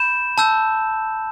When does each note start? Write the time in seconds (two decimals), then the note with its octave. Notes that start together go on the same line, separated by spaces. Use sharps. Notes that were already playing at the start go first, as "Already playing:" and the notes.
Already playing: B5 G6 E7
0.38 A5 E6 G6